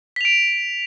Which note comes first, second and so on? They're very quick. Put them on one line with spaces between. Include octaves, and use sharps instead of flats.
B6 F7 D7